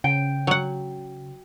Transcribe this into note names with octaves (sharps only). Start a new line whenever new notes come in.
C#3 G5
F#3 F#5